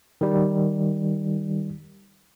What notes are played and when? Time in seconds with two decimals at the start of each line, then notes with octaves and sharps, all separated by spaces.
0.21 D#3 G3